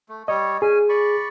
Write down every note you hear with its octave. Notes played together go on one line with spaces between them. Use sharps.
A3
G3 C#5 D#5
C#4 G#4 G#5
D5 B5 C#6